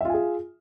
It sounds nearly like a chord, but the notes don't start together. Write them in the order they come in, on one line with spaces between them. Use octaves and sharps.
E5 F4 G#5 G#4